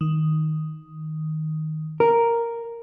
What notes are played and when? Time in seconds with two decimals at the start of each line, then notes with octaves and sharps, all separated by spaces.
0.01 D#3
2.00 A#4